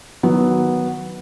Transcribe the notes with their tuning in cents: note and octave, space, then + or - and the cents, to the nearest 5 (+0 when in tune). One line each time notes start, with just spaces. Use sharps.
D#3 +10 F#3 +0 B3 -5